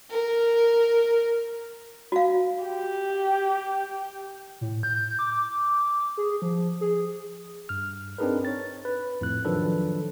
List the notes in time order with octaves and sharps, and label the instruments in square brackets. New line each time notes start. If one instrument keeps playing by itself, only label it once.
[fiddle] A#4
[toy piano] F#4 F5
[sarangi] G4
[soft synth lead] A2
G6
D6
G#4
F3
G#4
[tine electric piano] G2 F6
C4 D4 D#4 G#4 A#4 B4
C#5 A6
B4
F2 A2 F#6
D#3 F3 F#3 D4 A4 B4